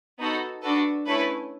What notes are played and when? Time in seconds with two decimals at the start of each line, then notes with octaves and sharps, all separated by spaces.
0.18 B3 D#4 F#4 A4
0.62 D4 F#4 A4 B4
1.06 A3 C#4 E4 A4 B4